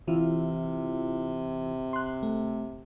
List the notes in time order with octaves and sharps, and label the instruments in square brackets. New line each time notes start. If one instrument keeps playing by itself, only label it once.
[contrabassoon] C3 [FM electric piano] E3 E4 F4
[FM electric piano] C6 F#6
A3